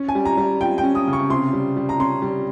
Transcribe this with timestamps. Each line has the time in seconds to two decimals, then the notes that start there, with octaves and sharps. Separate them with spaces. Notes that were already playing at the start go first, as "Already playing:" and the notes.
Already playing: C#4
0.09 G#5
0.15 G3
0.25 A#5
0.37 G3
0.61 F4 G5
0.78 G5
0.83 C#4
0.95 D#6
1.07 C#3
1.13 C#6
1.30 C3 C6
1.53 G3
1.76 G3
1.89 A#5
2.00 C#4 C6
2.22 G3